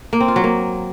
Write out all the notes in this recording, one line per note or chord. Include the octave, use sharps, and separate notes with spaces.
A#3
C4
F4
F#3
A#3